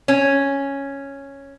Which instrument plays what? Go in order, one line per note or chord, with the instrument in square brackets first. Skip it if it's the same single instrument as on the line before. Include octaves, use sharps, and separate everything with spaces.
[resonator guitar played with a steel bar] C#4